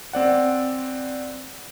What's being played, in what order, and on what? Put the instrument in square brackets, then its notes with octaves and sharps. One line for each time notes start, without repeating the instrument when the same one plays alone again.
[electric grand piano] C4 D5 F#5